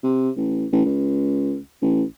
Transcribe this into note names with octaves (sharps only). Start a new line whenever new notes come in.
C3
A1
A1
C#2
A1